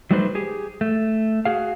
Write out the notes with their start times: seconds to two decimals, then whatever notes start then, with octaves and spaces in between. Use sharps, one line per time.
0.11 F#3 G3 A3 D#4 B4 C5
0.35 G4 G#4
0.81 A3
1.45 F#4 G#4 F5